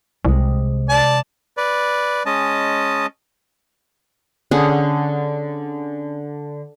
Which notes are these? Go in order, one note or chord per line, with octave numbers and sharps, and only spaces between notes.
C2 C3 G#3
D5 A5
B4 D5
G#3 C#4 D#5 A5
D3 C#4 G#4 F#5